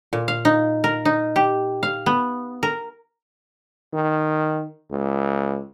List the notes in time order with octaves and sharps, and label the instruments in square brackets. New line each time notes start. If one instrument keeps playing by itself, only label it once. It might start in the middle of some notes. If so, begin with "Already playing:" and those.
[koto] A#2
F5
D#4
A#4
D#4
G4
F5
B3
A#4
[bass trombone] D#3
C#2